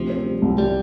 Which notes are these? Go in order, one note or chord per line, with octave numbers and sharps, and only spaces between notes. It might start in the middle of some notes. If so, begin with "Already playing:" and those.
Already playing: D2 C3 F3
C4
G3
C2
C3 G3